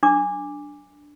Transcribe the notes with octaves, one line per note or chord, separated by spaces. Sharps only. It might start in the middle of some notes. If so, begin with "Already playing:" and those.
D4 D6